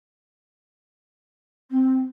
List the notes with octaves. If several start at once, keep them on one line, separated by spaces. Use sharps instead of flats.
C4